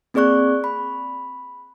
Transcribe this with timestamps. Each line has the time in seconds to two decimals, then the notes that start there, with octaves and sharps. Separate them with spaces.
0.14 A#3 C4 G#4 D5 C#6 F#6
0.64 B5